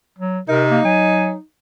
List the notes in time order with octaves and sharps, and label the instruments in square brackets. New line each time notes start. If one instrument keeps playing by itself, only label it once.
[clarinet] F#3
[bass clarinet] C3 [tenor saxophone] D#4 [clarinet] A#4
[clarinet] A#3
[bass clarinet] F#3 [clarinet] G#5